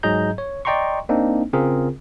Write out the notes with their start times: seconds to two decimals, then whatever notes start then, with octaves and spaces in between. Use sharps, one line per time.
0.03 G#2 F#3 G#4 D#5 A#5 G6
0.38 C#5
0.65 D5 D#5 G5 A#5 C6 C#6
1.09 A#3 C4 D4 D#4
1.53 C#3 C4 F4 G#4 A#4